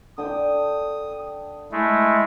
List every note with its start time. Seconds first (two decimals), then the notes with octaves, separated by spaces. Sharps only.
0.18 D3 G5 D6 D#6
1.72 G#3 A3 E4